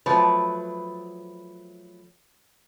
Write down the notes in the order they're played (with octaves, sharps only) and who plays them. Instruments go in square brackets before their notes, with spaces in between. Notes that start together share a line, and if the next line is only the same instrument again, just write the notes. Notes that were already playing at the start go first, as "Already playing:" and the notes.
[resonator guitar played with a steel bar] F3 F#3 A3 B4